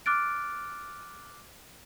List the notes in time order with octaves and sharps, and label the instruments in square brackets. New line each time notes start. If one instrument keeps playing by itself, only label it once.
[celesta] D6 F6 F#6 A6 D7